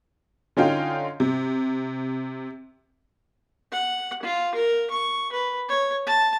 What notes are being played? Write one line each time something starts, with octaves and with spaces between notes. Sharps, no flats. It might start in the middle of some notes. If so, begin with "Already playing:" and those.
D3 C#4 D#4 F4 G5
C3
F#5
F4
A#4
C#6
B4
C#5
A5